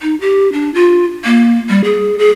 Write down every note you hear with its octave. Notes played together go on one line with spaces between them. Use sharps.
D#4
G4
D4
F4
A#3
G3
G#4
G#4